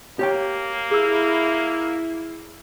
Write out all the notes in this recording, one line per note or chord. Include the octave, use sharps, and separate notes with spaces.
A#3 G4 C#5 G5
E4 G#4 E6